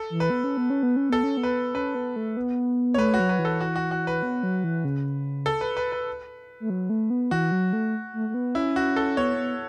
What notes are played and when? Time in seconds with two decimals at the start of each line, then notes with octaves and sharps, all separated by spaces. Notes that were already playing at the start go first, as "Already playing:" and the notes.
Already playing: A4
0.10 E3
0.20 B4
0.30 B3
0.44 C#4
0.57 B3
0.70 C#4
0.83 B3
0.96 C#4
1.10 B3 A4
1.23 C#4
1.37 B3
1.43 B4
1.75 C#4 B4
1.95 B3
2.16 A3
2.37 B3
2.94 C#5
2.98 A3 B4
3.14 F#4
3.20 F#3
3.29 B4
3.39 E3
3.45 A4
3.61 F#4
3.76 F#4
3.91 F#4
4.07 B4
4.23 B3
4.43 F#3
4.64 E3
4.85 C#3
5.46 A4
5.61 B4
5.77 B4
5.92 B4
6.60 A3
6.70 F#3
6.90 A3
7.10 B3
7.31 E3 F#4
7.52 F#3
7.73 A3
8.13 A3
8.29 A3
8.34 B3
8.55 C#4 E4
8.76 F#4
8.96 A4
9.17 B3 C#5
9.37 B3